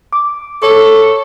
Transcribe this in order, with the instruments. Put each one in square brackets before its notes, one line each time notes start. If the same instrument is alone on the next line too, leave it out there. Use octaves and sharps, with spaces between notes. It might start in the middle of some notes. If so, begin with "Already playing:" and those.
[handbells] D6
[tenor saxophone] A4 [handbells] C#5 C#6